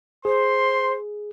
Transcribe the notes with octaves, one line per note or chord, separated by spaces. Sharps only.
G#4 C5 C6